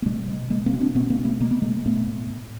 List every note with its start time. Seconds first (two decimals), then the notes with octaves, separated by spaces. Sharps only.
0.02 A#3
0.06 B2 G3 A3
0.28 B2
0.50 B2 G#3 A#3
0.66 A#3 C4
0.73 B2
0.80 C4 D4
0.95 B2 B3 C#4
1.10 A#3 C4
1.19 B2
1.25 A3 B3
1.40 B2 A#3
1.51 B3
1.62 B2 G#3 A#3
1.86 A2 A3 B3
2.07 A2
2.30 A2